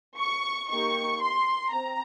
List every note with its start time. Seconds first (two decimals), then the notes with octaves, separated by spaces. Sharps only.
0.19 C#6
0.70 A#3 D#4 G4 C#6
1.22 C6
1.73 C4 A#5